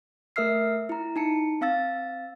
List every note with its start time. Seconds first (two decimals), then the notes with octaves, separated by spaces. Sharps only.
0.36 A3 A#4 E5 E6 F6 C7
0.89 E4 A#5
1.16 D#4 A5 C#7
1.61 C4 F5 E6 A6